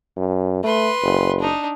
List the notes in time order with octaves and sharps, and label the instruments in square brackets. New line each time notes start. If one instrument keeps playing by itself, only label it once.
[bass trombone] F#2
[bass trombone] A3 [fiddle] B4 C6
[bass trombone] F#1
[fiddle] D4 D#4